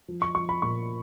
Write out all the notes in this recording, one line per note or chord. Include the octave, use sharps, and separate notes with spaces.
F3
C#6
F3 C#6
B5
A#2 C#6